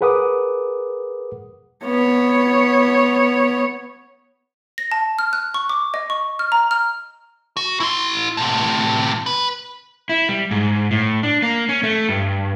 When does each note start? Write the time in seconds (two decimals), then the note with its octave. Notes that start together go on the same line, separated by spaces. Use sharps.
0.01 G#4 A#4 B4 F#5 D6 D#6
1.85 B3 C#5
4.78 A#6
4.92 A5
5.19 F6
5.33 F#6
5.54 C#6
5.70 D6
5.94 D#5
6.10 C#6
6.39 F6
6.52 A#5
6.71 F6
7.57 F#4
7.80 E4 C6
8.37 A2 C3
9.26 B4
10.09 E4
10.29 G3
10.51 G#2
10.91 A2
11.23 D4
11.42 A#3
11.69 C#4
11.83 A3
12.09 G2